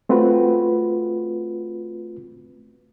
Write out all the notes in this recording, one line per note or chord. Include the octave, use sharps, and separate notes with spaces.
A3 C4 F4 F#4 B4